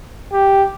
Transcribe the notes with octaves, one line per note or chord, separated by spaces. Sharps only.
G4